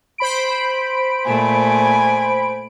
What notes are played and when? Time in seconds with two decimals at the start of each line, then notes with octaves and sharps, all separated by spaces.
0.18 C5 B5 D7
1.26 A#2 A3 G#5